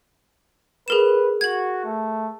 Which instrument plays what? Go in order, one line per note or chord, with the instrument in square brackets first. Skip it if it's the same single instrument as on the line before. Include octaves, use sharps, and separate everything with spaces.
[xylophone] G#4 A#4 E7 [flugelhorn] B4
[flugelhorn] F#4 [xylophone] G#6 F#7
[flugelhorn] A3